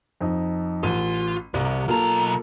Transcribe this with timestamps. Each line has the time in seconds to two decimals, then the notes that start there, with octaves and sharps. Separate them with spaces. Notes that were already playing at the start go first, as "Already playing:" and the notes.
0.21 F2 D#4
0.83 A1 F4 D#7
1.54 C2 C3
1.88 B1 A#3 F4 A4 A#5